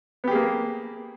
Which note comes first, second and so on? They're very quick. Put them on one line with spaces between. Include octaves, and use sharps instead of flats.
B3 G4 G#4 A#3